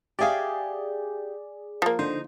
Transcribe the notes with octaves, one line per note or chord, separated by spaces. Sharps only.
G4 G#4 D5 E5 F5
F3 A#3
D3 D#4 C5